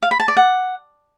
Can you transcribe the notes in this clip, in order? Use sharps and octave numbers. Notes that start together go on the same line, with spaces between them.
F5
B5
A5
D5
F#5